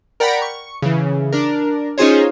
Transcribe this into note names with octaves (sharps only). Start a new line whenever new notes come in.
A#4 D5 F#5 G5 A#5 B5
C#6
C#3 E3
D4 A#4
C#4 D#4 F4 G#4 C5 C#5